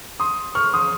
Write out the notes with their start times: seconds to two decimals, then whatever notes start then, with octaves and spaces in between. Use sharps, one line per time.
0.20 C6 D#6
0.55 C#6 F6
0.73 C6 D#6